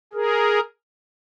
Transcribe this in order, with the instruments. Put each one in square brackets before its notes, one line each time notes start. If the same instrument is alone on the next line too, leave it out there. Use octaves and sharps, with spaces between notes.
[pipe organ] G#4 A#4